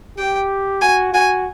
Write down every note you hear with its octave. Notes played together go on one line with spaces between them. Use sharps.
G4 G5
F#4 G#5
F#4 G#5